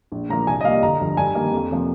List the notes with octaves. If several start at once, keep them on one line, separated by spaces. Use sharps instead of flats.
A#1
A#2 F3 A#3 A#5
C2 G#5
D#5
A#2 G3 A#3 F5
G1 A#5
G2 D3 F3
G2 G#5
D#3 G3 A#3
F2
C3 F3 A#3